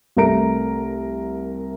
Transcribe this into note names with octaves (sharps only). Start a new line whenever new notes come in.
C2 A3 A#4 A#5 D7